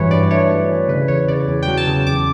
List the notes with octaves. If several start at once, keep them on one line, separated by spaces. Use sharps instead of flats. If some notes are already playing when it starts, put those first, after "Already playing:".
Already playing: G2 E3 F#3 B4 C#5
G2 D5
A3 C#5
G2
E3
C#3 B4
E2 C#5
C#3 D5
E2
F#3 G5
A5
C#3
E2 D6